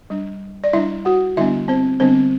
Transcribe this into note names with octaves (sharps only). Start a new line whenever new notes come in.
G3 D4
D5
G3 D4 E4 E5
F#4 F#5
D3 G3 B3 D4 E4 E5
C4 C5
D3 G3 B3 C4 D4 C5